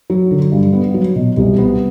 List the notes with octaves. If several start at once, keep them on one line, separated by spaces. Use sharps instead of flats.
F#3
D3
G2
B3
F#3
B2
C2
B3